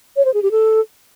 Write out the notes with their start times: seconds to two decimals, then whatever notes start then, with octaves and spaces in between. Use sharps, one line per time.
0.16 C#5
0.25 C5
0.34 G#4
0.43 G4
0.51 A4